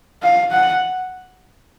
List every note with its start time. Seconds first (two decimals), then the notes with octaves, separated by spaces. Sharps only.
0.23 F5
0.52 F#5